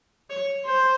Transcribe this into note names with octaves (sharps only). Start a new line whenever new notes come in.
C#5
C5